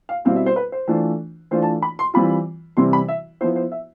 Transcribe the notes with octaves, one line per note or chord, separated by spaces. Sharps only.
F5
B2 G3 C4 E4 F5
E5
C5
B4
C5
E3 A3 D4 F4
E3 A3 D4 F4 C5
A5
B5
C6
E3 G3 C4 F4 B5
C3 E3 G3 C4 E4 C6
B5
E5
F3 B3 E4 C5
C5
E5